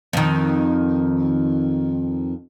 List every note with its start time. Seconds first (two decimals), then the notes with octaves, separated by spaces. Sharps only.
0.13 F2 D#3